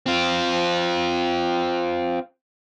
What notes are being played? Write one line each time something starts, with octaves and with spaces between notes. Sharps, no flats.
C4 F4